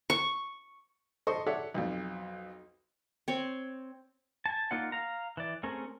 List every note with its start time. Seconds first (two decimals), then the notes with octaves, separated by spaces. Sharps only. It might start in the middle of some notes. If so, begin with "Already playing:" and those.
0.10 C#6
1.27 A4 C5 D#5 C6 C#6
1.47 A4 C#5 D5 E5 F#5
1.74 B1 F2
3.28 C4 C#5
4.46 G#5 A5
4.71 A#3 D#4 F4 D5 F#5
4.92 F5 A#5
5.37 E3 D5
5.63 A3 C4 C#4 G#4 A#4